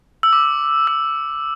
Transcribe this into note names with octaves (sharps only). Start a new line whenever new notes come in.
E6
D6
E6